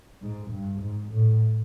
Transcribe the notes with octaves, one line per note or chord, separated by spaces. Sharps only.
G#2
G2
G#2
A2